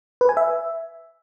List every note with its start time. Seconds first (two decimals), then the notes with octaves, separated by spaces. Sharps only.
0.21 B4
0.29 G#5
0.37 E5